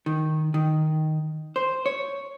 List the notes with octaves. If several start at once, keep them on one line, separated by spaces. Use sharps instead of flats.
D#3
D#3
C5
C#5